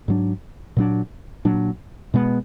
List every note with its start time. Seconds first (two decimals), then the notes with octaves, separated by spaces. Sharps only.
0.08 G#2 F#3 D4
0.77 A#2 F#3 D4
1.45 A#2 F#3 D4
2.14 B2 G#3 B3